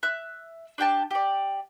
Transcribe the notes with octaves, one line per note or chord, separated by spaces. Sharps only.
E5 F#6
D4 G4 G5 A5
G4 D5